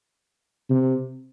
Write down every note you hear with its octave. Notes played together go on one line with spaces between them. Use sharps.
C3